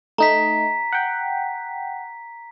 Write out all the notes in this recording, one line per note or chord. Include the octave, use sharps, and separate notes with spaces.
A3 D#4 A#5 B6
F#5 G5